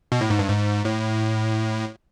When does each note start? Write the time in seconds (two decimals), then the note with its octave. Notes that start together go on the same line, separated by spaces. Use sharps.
0.12 B2
0.21 A2
0.30 G#2
0.39 G2
0.48 G#2
0.85 A2